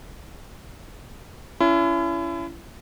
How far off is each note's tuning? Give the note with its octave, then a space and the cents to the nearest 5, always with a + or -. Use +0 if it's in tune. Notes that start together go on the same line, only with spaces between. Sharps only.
C#4 +30 E4 +35